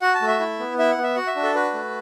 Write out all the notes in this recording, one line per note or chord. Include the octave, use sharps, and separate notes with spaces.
F#4 F#5
A5
A3
E5
E4
B3
E4 E5
F#5
B3
E5
F#4 F#5
E5
D4
A4
F#4 B4
A3